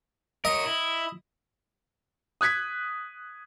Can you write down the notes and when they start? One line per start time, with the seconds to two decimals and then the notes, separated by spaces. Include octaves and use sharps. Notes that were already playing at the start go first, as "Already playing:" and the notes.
0.45 A#4 C#5 D#5
0.66 E4
2.41 D#6 F#6 G#6 B6